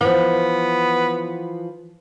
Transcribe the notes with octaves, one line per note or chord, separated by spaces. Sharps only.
E3 F3 B3